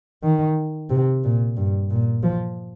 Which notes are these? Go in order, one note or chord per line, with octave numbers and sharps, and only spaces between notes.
D#3
C3
A#2
G2
A#2
F3